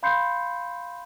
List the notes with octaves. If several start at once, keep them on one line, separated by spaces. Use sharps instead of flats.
F5 B5 C6 G6 C7 C#7